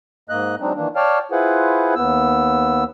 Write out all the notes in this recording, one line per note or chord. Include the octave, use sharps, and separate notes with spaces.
G#2 A#3 D#5 F#6
F#3 G#3 C4 D4 D#4
D#3 E3 A#3 D4
C#5 D5 F5 G5 A5 F6
E4 F4 G#4 B4 C5 F#5
D#2 B3 E6